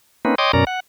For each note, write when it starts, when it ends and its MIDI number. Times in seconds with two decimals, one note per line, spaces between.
0.25 0.35 58
0.25 0.35 60
0.25 0.35 61
0.25 0.35 63
0.25 0.35 71
0.38 0.52 73
0.38 0.52 75
0.38 0.52 79
0.38 0.52 84
0.38 0.52 86
0.38 0.52 87
0.53 0.65 42
0.53 0.65 47
0.53 0.65 61
0.53 0.65 70
0.53 0.65 74
0.53 0.65 82
0.67 0.80 78